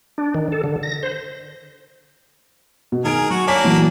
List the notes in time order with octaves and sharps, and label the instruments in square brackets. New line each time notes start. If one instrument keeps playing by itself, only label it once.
[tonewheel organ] D4
D#3
A4
D3
A#6
C5
[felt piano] B2
[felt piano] D#3 G#5 D7 [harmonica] G#4 A#4
[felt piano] F#3 [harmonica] F#4
[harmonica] A#3 D4 [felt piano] C#5 G#5 B6
[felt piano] A#2 E3 F#3